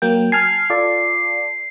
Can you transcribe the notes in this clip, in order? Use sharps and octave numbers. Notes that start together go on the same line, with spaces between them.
F#3 A#3 G5
G#5 A5 F6 C7
F4 A4 D5